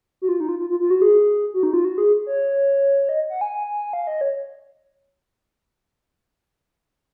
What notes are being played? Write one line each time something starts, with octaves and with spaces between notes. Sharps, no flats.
F#4
F4
D#4
F4
F4
F4
F4
F#4
G#4
F#4
D#4
F4
F#4
G#4
C#5
D#5
F#5
G#5
F5
D#5
C#5